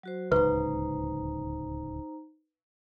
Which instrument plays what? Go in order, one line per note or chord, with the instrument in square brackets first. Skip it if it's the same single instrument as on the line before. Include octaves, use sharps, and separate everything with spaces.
[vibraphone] F#3 F#4 C5
[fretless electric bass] D1 C#2 [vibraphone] D#4 C5 A#5 [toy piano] B4